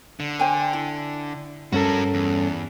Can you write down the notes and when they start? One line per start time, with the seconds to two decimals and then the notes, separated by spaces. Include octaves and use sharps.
0.20 D3
0.39 C5 G5 G#5
0.73 E4
1.73 G2 C#4 F#4 A4 A#4
2.14 E2